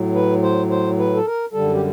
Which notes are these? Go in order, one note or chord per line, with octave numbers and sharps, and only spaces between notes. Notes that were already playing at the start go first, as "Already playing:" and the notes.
Already playing: A2 F#3
B4
C5
C5
B4
A4
A#4
F#2 D3 G3 A4
G4